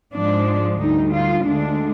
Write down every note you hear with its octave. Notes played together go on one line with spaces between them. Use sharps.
G#2 F3 G#3 D4
D2 D3 G3 D#4
F4
D2 D3 G#3 D4